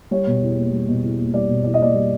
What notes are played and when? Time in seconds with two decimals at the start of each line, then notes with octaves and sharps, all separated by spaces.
0.11 G3 C#5
0.27 B2
0.42 E2
0.57 A#3
0.72 G3
0.88 B2
1.03 E2
1.19 A#3
1.34 G3 D5
1.49 B2
1.64 E2 D5
1.74 D#5
1.80 A#3 D5
1.95 G3